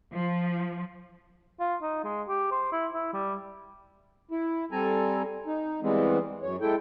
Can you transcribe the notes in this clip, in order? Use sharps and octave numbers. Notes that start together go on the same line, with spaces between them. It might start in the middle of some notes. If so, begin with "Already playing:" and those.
F3
F4
D#4
G#3
G4
C5
E4
E4
G3
E4
G3 C4 A4 G#5 A#5
D#4
E3 G3 G#3 B3 C4
F#2 C#5
G#3 E4 A4 G5